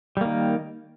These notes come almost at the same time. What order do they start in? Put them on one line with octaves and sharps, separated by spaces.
G3 A#3 D#3